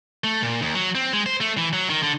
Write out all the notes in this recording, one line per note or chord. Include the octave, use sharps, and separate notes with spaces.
A3
A#2
D#2
F#3
C4
G#3
C5
A3
E3
F#3
D#3
D3